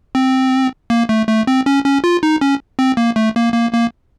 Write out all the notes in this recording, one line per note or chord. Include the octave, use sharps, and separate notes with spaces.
C4
A#3
A3
A3
C4
C#4
C#4
F4
D#4
C#4
C4
A#3
A3
A#3
A#3
A#3